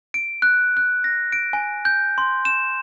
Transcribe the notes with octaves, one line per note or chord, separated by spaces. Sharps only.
D7
F#6
F#6
A#6
D7
G#5
G6
C6
E7